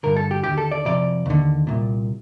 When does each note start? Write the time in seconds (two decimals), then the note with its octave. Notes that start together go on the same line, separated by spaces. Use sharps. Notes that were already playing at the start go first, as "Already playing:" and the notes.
0.03 G2 D3 A#4
0.16 A4
0.31 G4
0.44 D#2 D3 G4
0.58 A4
0.71 D5
0.85 F2 C3 D5
1.26 D#2 D3
1.67 C2 A#2